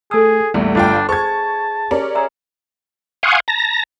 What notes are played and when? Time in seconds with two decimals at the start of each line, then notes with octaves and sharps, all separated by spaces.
0.11 A3 G#4 A4 A5 D#6 E6
0.54 A#1 E2 G3 A3 E5 B5
0.75 G1 D4 F4 G5
1.09 G#4 C5 A5 C#6 G#6
1.91 C#4 G4 A#4 D5
2.15 G#4 E5 A#5 E6
3.23 F5 F#5 G#5 C6 C#6 D#6
3.48 A5 A#5 A#6